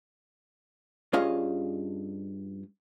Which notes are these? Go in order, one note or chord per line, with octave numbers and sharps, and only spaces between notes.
G2 C#4 F4 G#4 D#5 F5